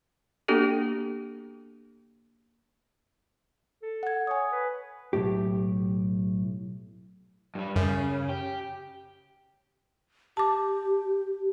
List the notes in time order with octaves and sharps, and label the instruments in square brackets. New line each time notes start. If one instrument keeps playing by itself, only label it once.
[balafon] A#3 B3 D4 F#4 G4 A4
[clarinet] A4
[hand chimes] F#5 G#6
[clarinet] C#5 [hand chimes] G#5 D#6
[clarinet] B4
[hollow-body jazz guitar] B1 F2 A2 G4
[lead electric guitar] G2 G3
[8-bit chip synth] F#2 [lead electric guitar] C#3
[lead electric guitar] G4
[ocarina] G4 [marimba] A5 D6